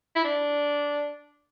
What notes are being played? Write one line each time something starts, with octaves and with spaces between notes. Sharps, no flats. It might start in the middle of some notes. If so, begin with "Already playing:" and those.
E4
D4